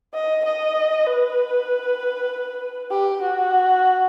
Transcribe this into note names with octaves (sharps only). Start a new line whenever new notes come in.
D#5
D#5
B4
G4
F#4